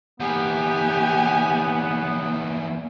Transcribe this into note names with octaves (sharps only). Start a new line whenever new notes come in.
E2 A#3 B3 G4 G#5